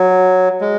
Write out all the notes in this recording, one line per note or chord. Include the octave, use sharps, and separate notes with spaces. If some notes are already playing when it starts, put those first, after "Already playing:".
Already playing: F#3
G#3